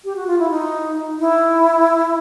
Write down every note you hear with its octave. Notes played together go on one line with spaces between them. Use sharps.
G4
F#4
F4
E4
D#4
E4